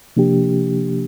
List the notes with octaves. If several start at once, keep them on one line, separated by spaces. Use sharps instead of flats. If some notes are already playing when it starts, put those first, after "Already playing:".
C3 F3 A#3 D4 G4